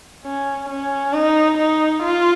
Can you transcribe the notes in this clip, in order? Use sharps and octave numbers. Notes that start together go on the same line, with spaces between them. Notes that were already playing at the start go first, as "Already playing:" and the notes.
C#4
C#4
D#4
D#4
F4